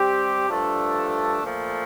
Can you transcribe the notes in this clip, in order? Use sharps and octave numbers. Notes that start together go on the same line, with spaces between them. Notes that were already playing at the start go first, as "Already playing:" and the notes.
Already playing: G3 C4 G4
G2 F3 A3 D4 A4
A#2 F3 A3